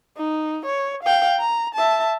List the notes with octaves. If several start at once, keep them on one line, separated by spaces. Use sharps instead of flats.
D#4
C#5
F5 G5
A#5
E5 A5